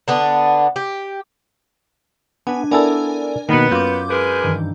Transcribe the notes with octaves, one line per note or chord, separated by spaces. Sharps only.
D3 B3 D4
G4
B3 D4 B4 G#5
B3 E4 A4 A#4 D5 G#5
B2 D#3 A#3 B3
F#2 F4 D6 G6
G#3 G#4 A#4 B4
G2 D#3 E3